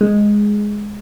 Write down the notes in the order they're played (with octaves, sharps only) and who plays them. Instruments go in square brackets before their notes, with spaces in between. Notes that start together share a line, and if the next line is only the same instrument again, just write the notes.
[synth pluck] G#3